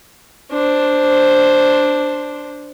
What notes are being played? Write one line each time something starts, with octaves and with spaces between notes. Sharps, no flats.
D4 C5